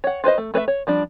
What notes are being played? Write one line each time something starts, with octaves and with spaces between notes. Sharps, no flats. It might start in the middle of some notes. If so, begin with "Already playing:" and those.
C#5 F#5
F4 B4 C5 D#5
A3
A3 B4 C#5 E5
C#5
F3 G3 D4